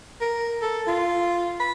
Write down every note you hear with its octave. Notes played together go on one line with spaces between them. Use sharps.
A#4
A4
F4
B5